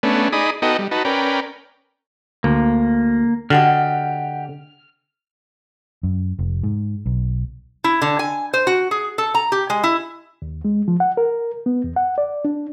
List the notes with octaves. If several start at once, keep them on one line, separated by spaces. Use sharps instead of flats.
A3 B3 C#4 D4
D#4 G#4 D5 B5 D#6
B3 D#4 F#4 A4 D#5 G5
G3
D#4 F#4 B4 A5
C#4 A#4 B4 D5 G5
D2 A#3
D3 F#4 G4 D#5 F6
F#2
F1
G#2
B1
E4
D3
G#5
C5
F#4
G#4
A4
A#5
G4
G#3
E4
D#2
G#3
F3
F#5
A#4
B3
E2
F#5
D5
D4